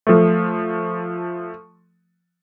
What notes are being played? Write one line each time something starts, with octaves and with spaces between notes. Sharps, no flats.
F3 A3